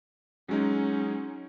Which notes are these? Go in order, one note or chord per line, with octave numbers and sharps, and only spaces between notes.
F#3 G#3 C#4 D#4